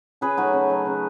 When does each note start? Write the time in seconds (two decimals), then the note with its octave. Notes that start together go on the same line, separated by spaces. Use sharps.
0.21 C#3 G#4 B4
0.37 F#3 A3 D#4 F#4
0.53 C#3
0.70 F#3 A3
0.86 C#3